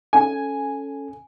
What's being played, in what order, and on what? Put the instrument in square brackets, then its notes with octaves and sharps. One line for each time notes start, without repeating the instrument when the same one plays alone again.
[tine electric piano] C#4 A4 [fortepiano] G#5